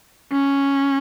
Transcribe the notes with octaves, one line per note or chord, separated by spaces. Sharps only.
C#4